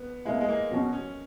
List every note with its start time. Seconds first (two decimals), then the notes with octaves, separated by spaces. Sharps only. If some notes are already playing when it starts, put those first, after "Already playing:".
Already playing: B3
0.25 B2 G#3 A#3 E4
0.41 G#3
0.49 A#3
0.71 B2 F#3 C#4 F#4
0.93 C#4